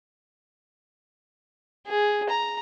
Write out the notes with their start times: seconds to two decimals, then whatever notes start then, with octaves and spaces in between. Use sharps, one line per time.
1.87 G#4
2.30 A#5